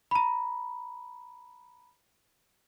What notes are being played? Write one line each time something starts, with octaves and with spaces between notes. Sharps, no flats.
A#5 B5